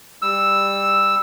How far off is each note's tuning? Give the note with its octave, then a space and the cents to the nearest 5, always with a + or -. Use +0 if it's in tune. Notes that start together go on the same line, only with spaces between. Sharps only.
G3 +15 E6 +0